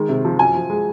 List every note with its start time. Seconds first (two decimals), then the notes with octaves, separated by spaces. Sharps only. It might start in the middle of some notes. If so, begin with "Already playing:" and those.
Already playing: D#3 G#3
0.09 C3
0.25 F3
0.39 F#2 G#5
0.55 F3
0.70 G#3